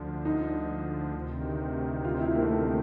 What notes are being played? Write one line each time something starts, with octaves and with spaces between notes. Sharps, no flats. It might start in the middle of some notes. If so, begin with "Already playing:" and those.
Already playing: D2 D3 F3
D#4
D2 C3 D#3
F4
E4
A#3
A3
A#3